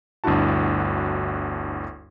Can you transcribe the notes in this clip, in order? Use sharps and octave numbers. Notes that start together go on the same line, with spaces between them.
G1 D2 D4 E4 F#4 A5